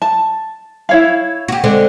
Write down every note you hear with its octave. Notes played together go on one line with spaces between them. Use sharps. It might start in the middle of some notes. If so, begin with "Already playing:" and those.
A5
E4 C#5 F5
F#4 G4
D3 G#3 C4